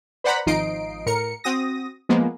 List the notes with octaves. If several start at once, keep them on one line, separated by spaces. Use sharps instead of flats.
B4 C5 D5 F#5 A#5 B5
G#1 F3 D#4 D#5 C7 D7
A2 A#4 C#7
C4 F#4 D#6 A#6
F3 G#3 A#3 B3